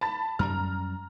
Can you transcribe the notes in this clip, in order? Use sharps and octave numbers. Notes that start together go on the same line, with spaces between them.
A5 B5 A6
F#2 G3 A#5 F6